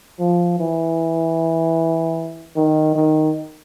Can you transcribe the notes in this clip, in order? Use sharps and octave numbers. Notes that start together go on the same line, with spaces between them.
F3
E3
D#3
D#3